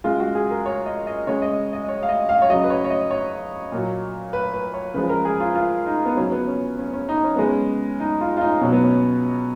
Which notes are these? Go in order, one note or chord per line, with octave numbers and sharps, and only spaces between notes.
C#3 G#3 F4
F#4
G#4
A#4
C#5
D#5
D#5
C#3 G#3 C#5
D#5
D#5
C#5
F5
D#5
F5
C#5
C#3 F#3 D#5
B4
C#5
C#5
D#5
C#5
A#2 F#3
B4
B4
C#5
C#3 F3 G#3 B4
A#4
G#4
F4
F4
D#4
B3
C#3 F#3 C#4
B3
C#4
C#4
C#4
D#4
C#4
C#3 G#3 B3
C#4
D#4
F4
F4
D#4
B2 F#3 C#4
B3
C#4